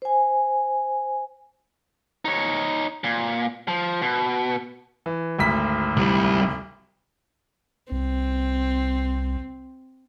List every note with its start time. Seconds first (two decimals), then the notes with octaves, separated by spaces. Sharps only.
0.02 C5 G#5
2.25 D#4 C#5
3.04 A#2
3.68 F3
4.02 B2
5.06 E3
5.38 G#1 D2 B6
5.96 C2 G3
7.92 C2 C4